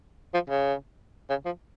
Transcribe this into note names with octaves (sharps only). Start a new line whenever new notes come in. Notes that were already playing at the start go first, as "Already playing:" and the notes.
F3
C#3
C#3
F3